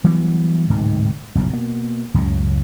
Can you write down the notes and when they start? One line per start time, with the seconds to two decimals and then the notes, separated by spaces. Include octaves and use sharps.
0.04 E3 F#3 G3 B3
0.70 D1 G#2 C3 D#3
1.35 F#1 B1 E2 A2
1.50 B2 A#3
2.14 C#2 F#2 A2 C#3